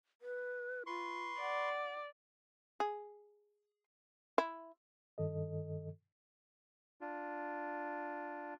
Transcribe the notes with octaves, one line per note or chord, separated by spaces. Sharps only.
B4
F4 B4 C6 C#6
D5 F#5
G#4
E4
G2 D#3 A4 D#5
D4 F4